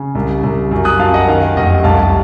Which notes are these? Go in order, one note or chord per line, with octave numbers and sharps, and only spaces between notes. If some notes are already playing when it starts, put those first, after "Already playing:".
Already playing: C#3
C2
C2
F#2
D#6 F#6
F#2 F5 A5
D#5 F#5
D#3 F5
F1 D#5 F#5
C2 F5 A5